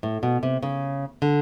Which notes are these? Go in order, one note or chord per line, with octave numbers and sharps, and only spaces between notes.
A2
B2
C3
C#3
D3